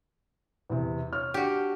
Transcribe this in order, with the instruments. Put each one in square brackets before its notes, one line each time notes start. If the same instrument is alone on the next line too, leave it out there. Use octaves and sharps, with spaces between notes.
[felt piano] E2 C3
C#5 F6
[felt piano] D4 [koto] F#4 G4